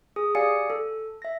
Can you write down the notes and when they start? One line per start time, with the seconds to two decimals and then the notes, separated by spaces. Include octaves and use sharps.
0.16 G#4 D#6
0.35 G4 D5 F5 G#5 D#6 C#7
0.70 A4
1.22 E5 A#6